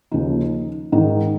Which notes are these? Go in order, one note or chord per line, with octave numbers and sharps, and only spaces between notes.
D#2 C#3 F3 D#4
G#2 D#3 D#4